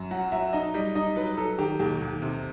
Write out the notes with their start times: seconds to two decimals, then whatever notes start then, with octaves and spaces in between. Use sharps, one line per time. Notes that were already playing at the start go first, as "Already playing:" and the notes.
Already playing: F#2
0.11 F#3 F#5
0.32 F#3 E5
0.53 D#4 D#5
0.74 G3 D#5
0.95 D#4 D#5
1.16 F#3 B4
1.37 F#3 A4
1.58 D#3 G4
1.79 D#2 G4
2.01 D#2
2.22 C3